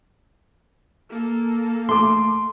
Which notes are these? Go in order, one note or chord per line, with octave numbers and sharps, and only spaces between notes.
A#3 A4
A3 C6 D6